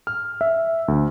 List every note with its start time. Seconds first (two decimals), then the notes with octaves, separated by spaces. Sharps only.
0.07 F6
0.41 E5
0.88 D2